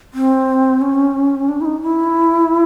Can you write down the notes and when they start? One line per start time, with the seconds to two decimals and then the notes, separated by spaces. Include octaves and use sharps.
0.14 C4
0.81 C#4
1.49 D4
1.61 E4
1.65 D#4
1.82 E4